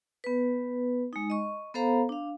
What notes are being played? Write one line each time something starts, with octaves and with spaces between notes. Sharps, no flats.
B3 B4
G#3 D#4
D#5 C#6
B3 A4 C5 F5 A#5 B5
D4 F5